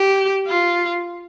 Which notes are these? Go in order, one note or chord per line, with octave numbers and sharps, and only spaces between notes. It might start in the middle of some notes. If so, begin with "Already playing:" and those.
Already playing: G4
F4